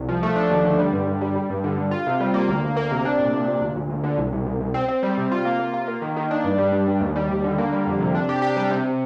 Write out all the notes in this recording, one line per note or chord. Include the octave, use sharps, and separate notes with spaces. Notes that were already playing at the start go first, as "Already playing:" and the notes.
Already playing: C2
F3
A3
D4
D#2
D3
G3
G2
G2
G3
G3
G2
D3
G2
F4
C3
G3
A#3
D2
D2
A#3
C3
D4
A#2
A#2
A#2
D2
D2
D2
D3
C2
C2
C2
C2
C4
C4
G3
C3
F4
A#3
A#3
F4
A#3
D#3
D#3
D4
G2
G3
G2
G2
D#2
G3
D#2
D3
A#3
G3
F2
C3
D4
G4
G4
G3
C3